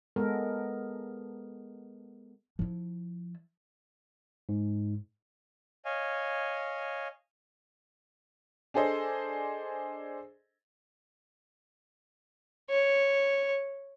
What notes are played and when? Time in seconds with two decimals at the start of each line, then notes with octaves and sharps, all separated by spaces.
0.16 G#3 B3 A4 A#4
2.59 F3 E4
4.49 G#2
5.85 C#5 D#5 F5 G#5
8.74 D4 G#4 A4 C5 D#5
12.70 C#5